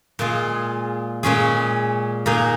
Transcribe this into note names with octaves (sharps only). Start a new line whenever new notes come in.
A#2 G#3 F4 G#4
A#2 G#3 C#4 G#4
A#2 A#3 D#4 G#4